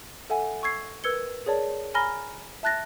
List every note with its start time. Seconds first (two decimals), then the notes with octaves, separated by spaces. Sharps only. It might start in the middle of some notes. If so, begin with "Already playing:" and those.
0.30 A4 E5 F#5 G#5
0.63 C#6 E6 G#6 C7
1.04 A#4 B4 E6 G#6 C#7 G7
1.46 G#4 A#4 C#5 D5 A5
1.94 G#5 A#5 B5 F6 A#6 G7
2.63 E5 A5 F#6 A6 A#6